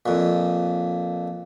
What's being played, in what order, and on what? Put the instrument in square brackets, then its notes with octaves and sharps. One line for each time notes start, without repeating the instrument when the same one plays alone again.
[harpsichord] F2 A#2